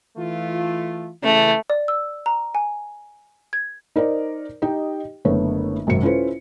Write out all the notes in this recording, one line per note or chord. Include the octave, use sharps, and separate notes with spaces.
E3 A3 F4
C#3 E3 A3
D5
E6
A#5
G#5
G#6
D#4 A#4 C5 D5
D#4 G4 D#5 G5
F#1 D3 A3 B3 C#5
G#1 F#2 C3 C#7
C#4 E4 F4 A4 B4 C5